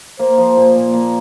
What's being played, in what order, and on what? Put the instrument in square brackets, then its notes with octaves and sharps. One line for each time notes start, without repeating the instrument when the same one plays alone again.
[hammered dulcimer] A#3 [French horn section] C5
[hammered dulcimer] F3
A#2
A#2
A#3